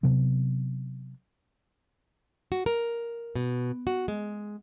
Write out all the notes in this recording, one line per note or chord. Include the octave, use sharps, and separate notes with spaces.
C3 F#3 B3
F#4
A#4
B2
F#4
G#3